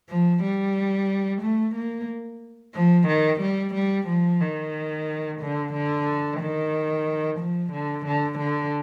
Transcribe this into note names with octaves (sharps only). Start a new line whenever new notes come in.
F3
G3
A3
A#3
F3
D#3
G3
G3
F3
D#3
D3
D3
D#3
F3
D3
D3
D3